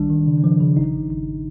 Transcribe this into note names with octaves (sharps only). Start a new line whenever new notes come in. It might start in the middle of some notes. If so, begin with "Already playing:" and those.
Already playing: C2 D#3 G3 D4
D#3
C#3
F3
C#3
G#1 D#4
G#1
G#1